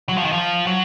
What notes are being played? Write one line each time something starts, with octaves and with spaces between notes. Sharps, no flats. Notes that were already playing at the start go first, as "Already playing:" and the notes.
F#3
F3
D#3
F3
F#3